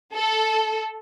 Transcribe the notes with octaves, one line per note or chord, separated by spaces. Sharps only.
A4